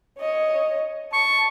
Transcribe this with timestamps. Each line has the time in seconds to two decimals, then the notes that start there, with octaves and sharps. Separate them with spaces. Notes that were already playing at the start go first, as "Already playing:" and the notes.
0.19 C#5 D#5
1.13 A5 C#6